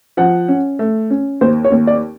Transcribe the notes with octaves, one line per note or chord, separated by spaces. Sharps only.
F3 F#5
C#4
A3
C#4
D#2 C5
C#5
D#2
D5